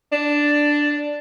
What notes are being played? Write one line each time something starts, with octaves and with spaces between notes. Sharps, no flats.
D4